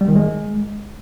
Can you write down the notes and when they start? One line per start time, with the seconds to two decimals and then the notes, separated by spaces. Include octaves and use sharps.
0.01 G3
0.08 D#3
0.16 G#3